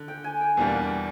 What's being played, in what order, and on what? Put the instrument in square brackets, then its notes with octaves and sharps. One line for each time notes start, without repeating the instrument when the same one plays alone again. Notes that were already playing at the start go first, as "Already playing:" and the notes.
Already playing: [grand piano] D3
[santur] G5
G#5
G5
[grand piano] E2 B2 G3 A#3 D4